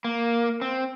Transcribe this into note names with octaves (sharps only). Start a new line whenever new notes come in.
A#3
C4